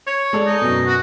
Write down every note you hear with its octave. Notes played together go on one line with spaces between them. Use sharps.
C#5
G#3 A4 D5
D#4
F#2 B2
F#4